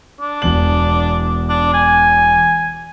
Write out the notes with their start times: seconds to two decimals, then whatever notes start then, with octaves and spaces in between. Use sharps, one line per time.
0.21 D4
0.42 E1 E2 F#7
1.50 D4
1.74 G#5